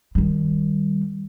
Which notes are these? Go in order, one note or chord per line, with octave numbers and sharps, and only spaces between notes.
D#3 G3